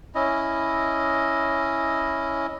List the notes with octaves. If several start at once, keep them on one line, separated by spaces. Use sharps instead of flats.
C#4 E4 D#5